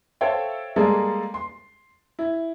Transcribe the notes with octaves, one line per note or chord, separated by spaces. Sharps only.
A4 C5 C#5 E5 F5 G5
G3 G#3 A#3 G#4 A4
C6
E4